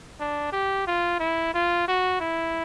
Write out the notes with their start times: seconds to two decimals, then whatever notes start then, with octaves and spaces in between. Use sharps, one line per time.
0.20 D4
0.53 G4
0.87 F4
1.20 E4
1.54 F4
1.88 F#4
2.20 E4